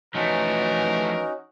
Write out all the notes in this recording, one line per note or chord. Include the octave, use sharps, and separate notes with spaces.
E3 F3 A3 C#4 D#4 F#4 A#4